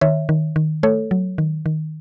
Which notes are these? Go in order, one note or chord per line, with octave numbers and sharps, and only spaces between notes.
D#3 C#5 E5
D#3
D#3
A3 A4 C#5
F#3
D#3
D#3